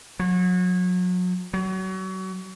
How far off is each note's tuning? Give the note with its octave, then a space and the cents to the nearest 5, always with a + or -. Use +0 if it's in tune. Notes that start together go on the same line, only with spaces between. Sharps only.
F#3 -35
F#3 +30